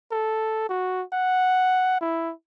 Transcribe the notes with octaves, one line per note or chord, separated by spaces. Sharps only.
A4
F#4
F#5
E4